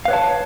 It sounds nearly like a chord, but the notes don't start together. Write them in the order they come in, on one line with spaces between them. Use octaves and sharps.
F5 B4 C#5 A5